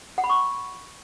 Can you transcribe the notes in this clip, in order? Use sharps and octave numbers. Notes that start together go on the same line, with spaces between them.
F#5
B5
C#6